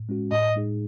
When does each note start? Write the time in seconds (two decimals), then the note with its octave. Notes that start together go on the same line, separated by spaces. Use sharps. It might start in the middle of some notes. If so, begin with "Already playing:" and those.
Already playing: A2
0.09 G#3 C#4 F#4
0.32 A2 D#5
0.56 G#3 D#4 G#4